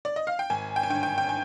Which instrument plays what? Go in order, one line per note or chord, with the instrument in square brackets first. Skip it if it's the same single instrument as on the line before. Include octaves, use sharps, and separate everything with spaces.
[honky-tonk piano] D5
D#5
F5
G5
G#1 G#5
G5
G#5
G2 D3 G5
G5
G5
G#5